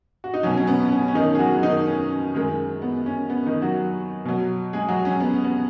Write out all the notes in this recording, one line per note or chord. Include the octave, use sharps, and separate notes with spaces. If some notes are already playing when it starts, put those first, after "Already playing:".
F#4
D#4
B2 F#3 C#4
C#4
B3
B3
C#4
C#4
D#3 D#4
G#4
F#3 F#4
D#3 D#4
C#4
F#2 D#3 G#3
B3
C#4
B3
D#3 D#4
F#3 F#4
B2 F#3
G#3 G#4
F#3 F#4
C#4
B3
B3